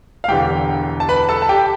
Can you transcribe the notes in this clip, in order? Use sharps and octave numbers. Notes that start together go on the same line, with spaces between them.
F5
E1 E2 D3 G4 G5
A5
B4 B5
A4 A5
A5
G4 G5